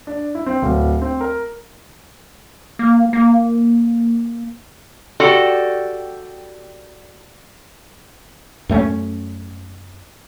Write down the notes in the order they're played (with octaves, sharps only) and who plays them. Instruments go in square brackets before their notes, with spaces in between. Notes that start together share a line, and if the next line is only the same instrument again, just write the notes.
[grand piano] D4
E4
C4
D1
C4
A#4
[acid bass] A#3
A#3
[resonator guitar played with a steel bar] F#4 G4 A4 D5
[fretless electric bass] F#2 A3 B3 C#4